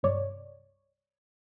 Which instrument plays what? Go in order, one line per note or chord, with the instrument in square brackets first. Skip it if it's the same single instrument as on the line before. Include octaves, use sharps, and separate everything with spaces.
[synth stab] C2 G2 C#5 D5